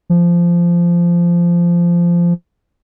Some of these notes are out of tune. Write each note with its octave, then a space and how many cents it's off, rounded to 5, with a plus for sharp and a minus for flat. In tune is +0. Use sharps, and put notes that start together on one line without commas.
F3 -15